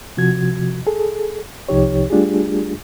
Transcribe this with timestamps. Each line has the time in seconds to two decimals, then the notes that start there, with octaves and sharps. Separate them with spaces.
0.17 C3 F3 F#4 G#6
0.87 G#4 A4
1.69 C2 C3 F3 D#4 G4 C#5
2.10 G3 A3 D4 F4 G4 G#4